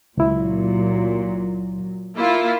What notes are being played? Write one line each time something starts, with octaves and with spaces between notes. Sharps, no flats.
C#2 A#2 F#3 E4
A#3 E4 F4